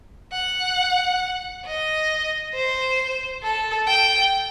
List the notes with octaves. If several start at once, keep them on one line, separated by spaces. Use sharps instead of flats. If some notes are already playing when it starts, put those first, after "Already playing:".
F#5
D#5
C5
A4
G5